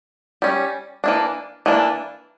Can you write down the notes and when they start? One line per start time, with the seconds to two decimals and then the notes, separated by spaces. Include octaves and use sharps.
0.42 G3 C#4
1.04 E3 A#3 D4
1.66 E3 A#3 D4